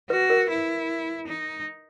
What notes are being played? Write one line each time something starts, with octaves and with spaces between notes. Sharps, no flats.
F#4 B4
A#4
E4
D#4